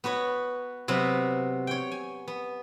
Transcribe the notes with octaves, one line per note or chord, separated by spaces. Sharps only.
B3 F#4 B4 C#5
C3 F#3 B3
C#5 G5
G#5
B3